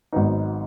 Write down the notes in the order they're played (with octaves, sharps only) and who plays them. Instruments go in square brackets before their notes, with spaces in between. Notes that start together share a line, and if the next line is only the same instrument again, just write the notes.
[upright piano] G#1 G#2 F#3 B3 D#4